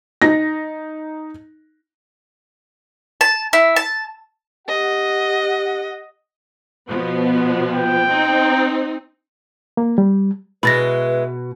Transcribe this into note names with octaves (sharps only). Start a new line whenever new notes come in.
D#4 A#6
A5
E4
A5
G4 D#5 F#5
B2 F3 B3
G5
C4 D#4
A#3
G3
B2 G#3 E4 B4 B5 A6 A#6